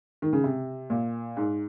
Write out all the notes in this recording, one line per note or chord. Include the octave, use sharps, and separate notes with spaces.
D#3
C#3
C3
A#2
G#2